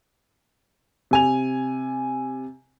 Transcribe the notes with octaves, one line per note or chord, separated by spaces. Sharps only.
C3 G#5 F7